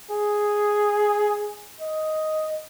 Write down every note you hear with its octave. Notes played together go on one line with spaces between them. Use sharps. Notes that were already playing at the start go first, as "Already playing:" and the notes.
G#4
D#5